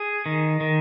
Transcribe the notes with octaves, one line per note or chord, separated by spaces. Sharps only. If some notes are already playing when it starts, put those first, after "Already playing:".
Already playing: G#4
D#3
D#3